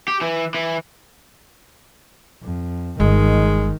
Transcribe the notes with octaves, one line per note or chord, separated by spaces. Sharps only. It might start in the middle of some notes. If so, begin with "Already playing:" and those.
G4
E3
E3
F2
G1 D#3 G#3